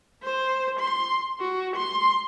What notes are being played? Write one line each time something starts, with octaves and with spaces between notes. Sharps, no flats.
C5
C6
F#4
C6